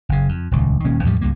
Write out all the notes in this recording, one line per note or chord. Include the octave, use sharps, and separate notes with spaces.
F#1 C#3
F2
D#1 C#2
D#1 D#3 A#3 C#4
E2 A2 F3 G3
C#2 G2 A#3